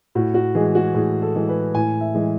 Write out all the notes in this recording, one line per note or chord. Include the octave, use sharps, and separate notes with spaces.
A2 F#4
F#4
E3 G#3 G#4
F#4
A2 G#4
A4
E3 G#3
B4
A2 G#5
E5
E3 G#3